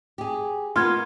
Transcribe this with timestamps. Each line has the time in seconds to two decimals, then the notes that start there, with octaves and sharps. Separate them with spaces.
0.18 G4 G#4
0.76 A#3 B3 F4 C6 F6 G#6